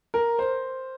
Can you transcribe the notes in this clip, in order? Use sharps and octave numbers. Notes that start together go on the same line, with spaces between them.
A#4
C5